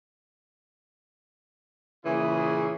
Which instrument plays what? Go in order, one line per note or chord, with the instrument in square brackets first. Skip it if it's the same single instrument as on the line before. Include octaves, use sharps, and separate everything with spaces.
[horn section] A#2 C#3 E3 E4 G#4